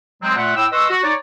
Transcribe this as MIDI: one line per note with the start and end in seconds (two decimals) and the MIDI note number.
0.22 0.33 54
0.22 0.33 56
0.22 0.33 60
0.36 0.54 46
0.36 0.54 57
0.36 0.54 65
0.36 0.54 76
0.36 0.54 78
0.55 0.65 45
0.55 0.65 79
0.55 0.65 88
0.72 0.88 71
0.72 0.88 75
0.72 0.88 84
0.72 0.88 85
0.72 0.88 88
0.89 0.99 66
1.03 1.13 63
1.03 1.13 73
1.03 1.13 74